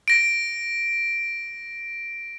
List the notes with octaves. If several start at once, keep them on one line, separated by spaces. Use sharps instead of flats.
A#6 D7